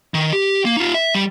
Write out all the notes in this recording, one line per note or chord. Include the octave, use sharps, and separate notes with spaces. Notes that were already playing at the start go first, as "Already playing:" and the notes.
D#3
G4
A#3
D#4 F4
E5
G3